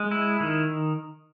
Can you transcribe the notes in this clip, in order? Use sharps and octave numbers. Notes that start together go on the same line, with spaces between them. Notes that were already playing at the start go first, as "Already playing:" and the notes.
Already playing: G#3
E4
D#3